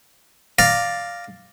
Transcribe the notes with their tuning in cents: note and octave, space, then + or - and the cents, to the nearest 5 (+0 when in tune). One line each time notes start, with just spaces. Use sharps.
D5 +5 F5 +0 A#5 +0